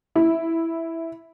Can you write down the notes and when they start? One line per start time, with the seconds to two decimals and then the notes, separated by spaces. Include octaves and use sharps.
0.16 E4